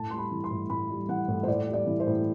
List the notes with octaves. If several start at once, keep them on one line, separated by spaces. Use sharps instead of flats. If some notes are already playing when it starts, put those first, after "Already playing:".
Already playing: A2 A5
G3 C6
B5
E3
C6
A2
A2 B5
G3
E3 F#5
A2
C5
A2 D5
G3
D5
E3
C5
A2